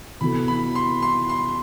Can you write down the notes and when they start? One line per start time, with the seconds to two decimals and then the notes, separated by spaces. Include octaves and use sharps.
0.21 C3 E3 B3 F#4 A4 B5
0.48 B5
0.75 C6
1.02 C6
1.29 C6